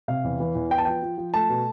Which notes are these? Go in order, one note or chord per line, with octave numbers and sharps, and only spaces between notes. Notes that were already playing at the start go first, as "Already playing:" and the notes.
C3 F5
E2
E3
E2
B3 G5
A5
F3 G5
F3
F3
A3 A5
B2